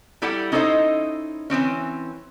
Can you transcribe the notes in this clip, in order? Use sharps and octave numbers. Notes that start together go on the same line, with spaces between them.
G3 E4 G4 A4 F#5
C#4 D#4 E4 A4 C5 D#5
E3 G#3 C4 C#4